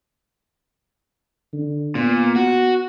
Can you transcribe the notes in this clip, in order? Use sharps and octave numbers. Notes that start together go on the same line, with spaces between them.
D3
A#2 B3
F#4